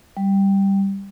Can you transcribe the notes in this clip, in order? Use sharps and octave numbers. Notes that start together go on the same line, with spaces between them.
G3